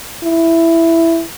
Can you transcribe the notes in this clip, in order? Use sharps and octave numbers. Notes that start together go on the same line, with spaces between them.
E4